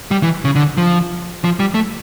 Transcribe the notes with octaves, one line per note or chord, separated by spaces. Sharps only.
G3
E3
C#3
D3
F3
F3
G3
A3